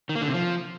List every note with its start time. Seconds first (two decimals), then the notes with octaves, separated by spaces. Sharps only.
0.09 D#3
0.16 A#3
0.22 D3
0.28 C3
0.34 F3